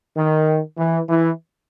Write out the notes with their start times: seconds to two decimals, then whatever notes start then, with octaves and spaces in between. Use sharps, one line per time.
0.17 D#3
0.78 E3
1.09 E3